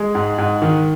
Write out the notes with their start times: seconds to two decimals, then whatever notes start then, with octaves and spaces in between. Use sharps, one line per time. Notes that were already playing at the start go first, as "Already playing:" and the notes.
Already playing: G#3
0.15 G#2
0.38 G#2
0.62 D#3